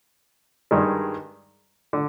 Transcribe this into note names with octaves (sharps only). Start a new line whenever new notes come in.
G2 D#3 G#3
D3